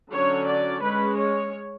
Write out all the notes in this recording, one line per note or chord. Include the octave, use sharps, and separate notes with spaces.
D3 F#3 C#4 C#5
D5
G#3 C#4 B4
C#5